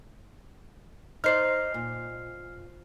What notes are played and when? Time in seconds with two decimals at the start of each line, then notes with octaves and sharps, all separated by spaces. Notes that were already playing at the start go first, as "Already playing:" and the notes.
1.24 D#4 C5 D5 F6 C7
1.74 A#2